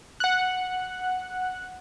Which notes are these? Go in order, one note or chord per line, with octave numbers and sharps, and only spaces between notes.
F#5 F#6